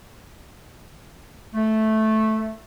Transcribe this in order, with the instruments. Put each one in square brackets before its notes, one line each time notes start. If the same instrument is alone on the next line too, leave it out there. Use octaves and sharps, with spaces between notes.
[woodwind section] A3